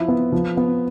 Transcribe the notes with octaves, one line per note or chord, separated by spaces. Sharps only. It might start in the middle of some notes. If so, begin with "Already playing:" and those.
Already playing: F3 E4
B3
F3
B3